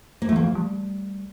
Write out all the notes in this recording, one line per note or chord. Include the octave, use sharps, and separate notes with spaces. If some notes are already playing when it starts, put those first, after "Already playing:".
A#3
A3
E3
A#3
F3
G3